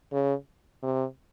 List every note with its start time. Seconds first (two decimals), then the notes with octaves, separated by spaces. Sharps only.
0.12 C#3
0.83 C3